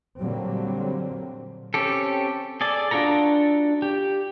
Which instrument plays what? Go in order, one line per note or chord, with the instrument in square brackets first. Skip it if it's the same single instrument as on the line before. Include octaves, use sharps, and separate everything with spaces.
[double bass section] A#2 D3 F#3 G3 A#3 C4
[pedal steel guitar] C4 C#4 G4 A4
G#4 A4 D5
D4 F4 F#4 A4 A#5
G4